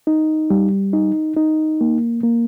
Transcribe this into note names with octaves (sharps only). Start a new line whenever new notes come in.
D#4
G3
D#4
D#4
A#3
A#3